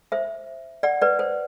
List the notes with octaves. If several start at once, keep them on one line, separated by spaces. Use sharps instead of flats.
C5 E5
D5 F#5
B4 D5
C5